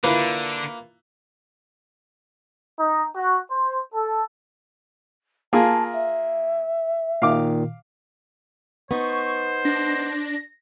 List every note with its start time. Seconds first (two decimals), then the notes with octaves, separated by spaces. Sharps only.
0.04 D3 A#3 E4 F4 B4
2.78 D#4
3.15 F#4
3.50 C5
3.93 A4
5.53 A#3 F4 G#4 A5
5.93 E5
7.22 A#2 D#3 F5 D6
8.91 B3 D#4 C5 C#6
9.65 D4 A#6